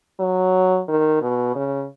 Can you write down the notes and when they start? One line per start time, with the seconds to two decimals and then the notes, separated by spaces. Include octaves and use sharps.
0.20 F#3
0.88 D#3
1.21 B2
1.55 C#3